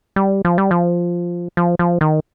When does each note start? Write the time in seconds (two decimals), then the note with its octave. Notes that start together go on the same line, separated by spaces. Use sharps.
0.16 G3
0.45 F3
0.58 G3
0.71 F3
1.57 F3
1.79 F3
2.01 D#3